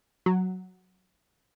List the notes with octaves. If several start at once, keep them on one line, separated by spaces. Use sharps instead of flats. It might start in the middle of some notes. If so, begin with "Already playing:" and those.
F#3